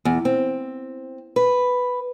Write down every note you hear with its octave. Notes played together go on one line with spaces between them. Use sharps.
E2
C4
B4